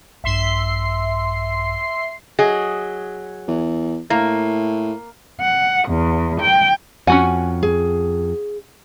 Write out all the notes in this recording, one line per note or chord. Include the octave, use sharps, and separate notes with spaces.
A#1 G2 E5 C6 C7
F#3 G#4 D#5
E2
A2 A#3
F#5
E2
G5
F2 C#4 F#4 F#5 G#5
G#4